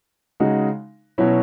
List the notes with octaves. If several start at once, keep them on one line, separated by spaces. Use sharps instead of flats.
C#3 G#3 D#4 F#4
B2 F#3 C#4 E4